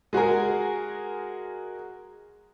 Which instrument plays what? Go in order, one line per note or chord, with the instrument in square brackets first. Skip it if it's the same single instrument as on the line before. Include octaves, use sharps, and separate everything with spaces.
[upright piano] G#3 F#4 G#4 A#4